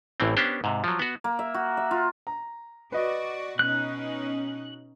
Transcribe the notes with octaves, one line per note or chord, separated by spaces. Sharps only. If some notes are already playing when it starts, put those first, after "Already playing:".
A1 A2 E3 C4
B3 C#4 D4 G4 C5
G#2 C3
F3 F#3
B3 F#4
A#3
E5
F#4
E5
F4
A#5
F#4 B4 D5 D#5
B2 C#4 D#4 F#6